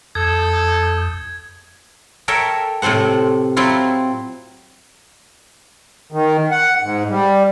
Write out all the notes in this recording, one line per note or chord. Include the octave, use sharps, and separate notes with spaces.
F2 A4 D#6 G6 G#6
A4 A#4 C#5 E5 G5 A5
A2 C3 A4 C5 F#5
F#3 C4 E4 F4
D#3
F#5
G#2
G3